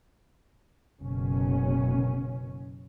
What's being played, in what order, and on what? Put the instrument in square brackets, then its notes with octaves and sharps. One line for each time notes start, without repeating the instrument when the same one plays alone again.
[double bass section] F#1 B2 C#4